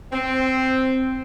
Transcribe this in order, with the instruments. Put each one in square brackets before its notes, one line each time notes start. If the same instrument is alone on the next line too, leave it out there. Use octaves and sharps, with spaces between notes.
[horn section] C4